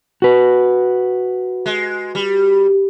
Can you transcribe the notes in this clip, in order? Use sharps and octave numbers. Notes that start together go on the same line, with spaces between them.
F#4 B4
G#3
G3